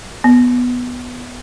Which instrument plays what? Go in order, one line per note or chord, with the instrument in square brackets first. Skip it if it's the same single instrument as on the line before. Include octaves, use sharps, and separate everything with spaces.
[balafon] B3